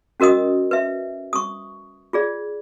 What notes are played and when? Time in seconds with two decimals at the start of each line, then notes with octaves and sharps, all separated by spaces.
0.20 C#4 F#4 A#4 D#5 D#6
0.71 B4 E5
1.33 C#6 D#6
2.13 F4 G#4 D5